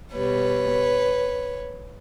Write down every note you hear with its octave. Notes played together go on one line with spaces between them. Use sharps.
B2 G3 B4 C#5